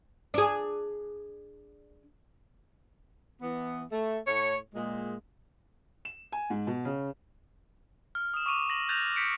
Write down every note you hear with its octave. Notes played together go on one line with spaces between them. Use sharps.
D4 G#4
E3 B3
A3
A2 C#5
A#2 G#3
E7
G#5
G#2
B2
C#3
F6
D#6 E7
C#6 D6 D#7 F7
A#6 D#7 F#7
F#6 G6 A6 A#6 F7
G6 B6 C#7 D7